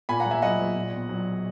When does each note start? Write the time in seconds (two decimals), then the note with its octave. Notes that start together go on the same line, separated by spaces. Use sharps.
0.09 A#2 G#5 B5
0.20 F#5 A#5
0.26 A#1
0.31 E5 G#5
0.42 F#3 D#5 F#5
0.59 A#1
0.76 A#2
0.92 B1
1.09 F#3